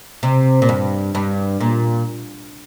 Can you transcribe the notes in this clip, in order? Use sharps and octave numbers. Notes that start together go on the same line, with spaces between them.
C3
A#2
G2
G2
A#2